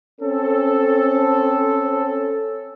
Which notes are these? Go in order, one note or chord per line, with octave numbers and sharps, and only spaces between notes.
C4 C#4 A4